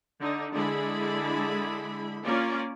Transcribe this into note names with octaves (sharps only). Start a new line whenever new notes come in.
D3 D#4
D3 G#3 E4 G#4 B5
A#3 C#4 F4 D5